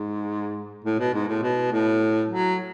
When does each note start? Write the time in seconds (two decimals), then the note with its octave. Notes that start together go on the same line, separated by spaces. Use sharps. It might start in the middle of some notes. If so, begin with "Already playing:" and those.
Already playing: G#2
0.84 A2
0.99 B2
1.14 G#2
1.28 A2
1.42 B2
1.72 A2
2.30 F#3